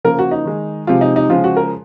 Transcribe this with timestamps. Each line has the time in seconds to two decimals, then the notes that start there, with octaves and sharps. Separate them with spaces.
0.04 C#3 F3 A#3 A#4
0.19 F#4
0.31 D#4
0.45 D#3 G#3
0.87 C3 F3 G#3 F4
1.01 D#4
1.16 D#4
1.30 C#3 F3 G#3 F4
1.44 F#4
1.57 A#4